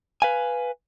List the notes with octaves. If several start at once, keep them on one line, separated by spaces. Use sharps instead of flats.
B4 F5 G#5